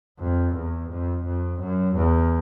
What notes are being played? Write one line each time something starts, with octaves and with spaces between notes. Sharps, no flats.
F2
E2
F2
F2
F#2
E2